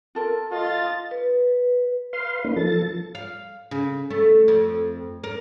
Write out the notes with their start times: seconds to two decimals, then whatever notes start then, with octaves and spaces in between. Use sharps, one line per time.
0.15 F4 A4 A#4
0.52 F4 A4 D#5 A6
1.11 B4
2.13 B4 F5 C6
2.44 A#3 C#4 D#4 B4
2.56 F3 A4 A6
3.15 F5
3.71 C#3
4.10 A3
4.48 F2
5.24 A#4